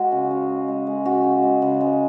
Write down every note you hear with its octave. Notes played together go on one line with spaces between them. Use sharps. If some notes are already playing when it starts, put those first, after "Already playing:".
Already playing: G#3 F#4
C#3
G#3
G#3
G#3
G#3
C#3 F#4
C#3
G#3
C#3
G#3